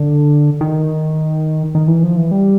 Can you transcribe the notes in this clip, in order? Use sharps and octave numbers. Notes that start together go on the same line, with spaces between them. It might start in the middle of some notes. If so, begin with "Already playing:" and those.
Already playing: D3
D#3
D#3
E3
F3
E3
G3